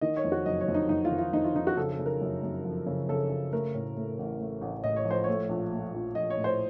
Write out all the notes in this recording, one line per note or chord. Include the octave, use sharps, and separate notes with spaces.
D#3 D#5
C#5
F2
F#4
F#1 D#5
C#5
F2
D#4
F2 D#4
F4
D#3
F4
F2 D#4
F4
D#3 D#4
F#4
C#3 A4
A4
C#3
A#4
F#2
F#2
F3
C#3
C#3 A4
C#3
A3 A#4
A2
A3
A1
A3
A1
A2 D#5
C#5
F3
C5
A3 C#5
A#1
A3
A#1
A#1 D#5
C#5
A2
C5